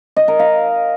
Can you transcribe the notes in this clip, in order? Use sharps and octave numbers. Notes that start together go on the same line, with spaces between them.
D#5
A#4
F5